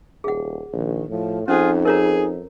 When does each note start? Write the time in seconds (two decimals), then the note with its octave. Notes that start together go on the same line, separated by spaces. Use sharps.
0.24 D#1 G#4 F#5
0.73 A#1 D#3
1.09 A2 F3
1.48 F2 C#4 D#4 F4 G#4 C5
1.85 G#4 A#4 C#5 A#5